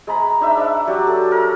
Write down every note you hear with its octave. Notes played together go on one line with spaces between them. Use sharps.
G#3 A#5 B5
D4 D#4 E5 B5
D5 E5 F#5
F#3 D4 G4
A4
A4 A#4